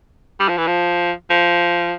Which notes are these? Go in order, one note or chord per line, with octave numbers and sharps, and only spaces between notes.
G3
F3
E3
F3
F3